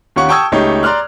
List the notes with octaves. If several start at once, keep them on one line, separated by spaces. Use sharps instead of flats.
D#2 C#4 F4 F#5 C#6
G5 A5 C#6 D#6 E6 G#6
C#2 A3 D#4 G4 C#5
D5 A#5 C6 D6 F6 F#6